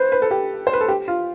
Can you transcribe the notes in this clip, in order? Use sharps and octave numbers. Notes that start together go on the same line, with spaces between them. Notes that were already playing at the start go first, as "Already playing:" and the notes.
Already playing: B4 C5
B4
A4
G4
C5
B4
A4
G4
F4